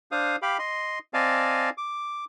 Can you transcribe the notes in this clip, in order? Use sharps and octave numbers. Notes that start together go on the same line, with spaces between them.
D4 C5 F5 D#6
G4 F5 G5 B5
D#5 C6
C4 D5 D#5 F5 G#5 A5
D6